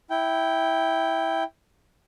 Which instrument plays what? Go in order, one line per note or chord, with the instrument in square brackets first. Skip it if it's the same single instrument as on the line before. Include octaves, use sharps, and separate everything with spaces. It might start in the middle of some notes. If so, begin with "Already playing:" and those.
[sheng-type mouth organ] E4 G5